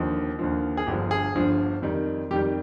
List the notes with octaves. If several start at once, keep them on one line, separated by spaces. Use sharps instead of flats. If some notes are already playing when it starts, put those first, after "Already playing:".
Already playing: D#2 D3 F3
D#2 D3 F3
G#4
G1 G2 D3 F3 G4
G#4
G1 G2 D3 F3
F2 D#3 G3
F2 D#3 G3 G4